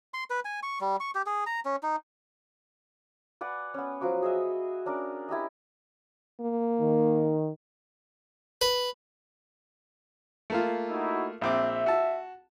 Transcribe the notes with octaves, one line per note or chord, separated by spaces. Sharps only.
C6
B4
G#5
C#6
G3
C#6
G4
G#4
A#5
C#4
D#4
B4 D5 F#5 G#5
B3 C#4
F3 F#3 F#4 D6
G#4 D#5 E5
C#4 D4 A#4 D5
E4 G4 A#4 D#5
A#3
D#3
B4
A3 A#3 F4
D#4 E4 F#4
A#1 C4 E5 D6
F#4 A5